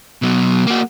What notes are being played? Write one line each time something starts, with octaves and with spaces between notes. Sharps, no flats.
B2 F#3
A#3 F#4